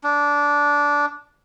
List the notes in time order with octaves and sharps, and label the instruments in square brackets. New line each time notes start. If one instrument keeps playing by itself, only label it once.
[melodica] D4